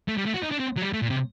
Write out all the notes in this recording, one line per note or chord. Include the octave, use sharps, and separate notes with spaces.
A3
G3
A3
F#4
D#4
D4
C4
F#3
G3
A3
A#2
C3